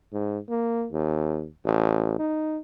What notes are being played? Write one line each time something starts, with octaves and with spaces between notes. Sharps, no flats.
G#2
A#3
D#2
A1
D#4